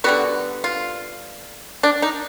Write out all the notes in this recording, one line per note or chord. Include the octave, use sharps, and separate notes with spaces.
D3 G3 B3 F#4
F4
D4
D#4